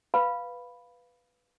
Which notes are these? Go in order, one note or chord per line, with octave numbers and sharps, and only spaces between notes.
B4 F5 B5